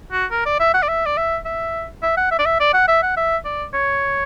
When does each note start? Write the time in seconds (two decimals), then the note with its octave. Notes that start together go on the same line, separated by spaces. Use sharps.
0.12 F#4
0.31 A#4
0.46 D5
0.60 E5
0.74 F#5
0.83 D5
0.88 E5
1.06 D5
1.17 E5
1.45 E5
2.03 E5
2.17 F#5
2.31 E5
2.39 D5
2.46 E5
2.60 D5
2.74 F#5
2.88 E5
3.03 F#5
3.17 E5
3.45 D5
3.74 C#5